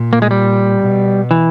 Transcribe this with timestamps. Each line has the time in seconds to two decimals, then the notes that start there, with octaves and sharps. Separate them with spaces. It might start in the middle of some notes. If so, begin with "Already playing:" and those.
Already playing: A#2
0.13 A#3
0.22 G#3
0.31 G3
0.81 B2
1.31 E3